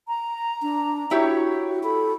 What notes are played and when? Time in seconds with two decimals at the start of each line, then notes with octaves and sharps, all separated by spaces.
0.08 A#5
0.62 D4
1.11 E4 F#4 G4 C#5
1.83 A4 B5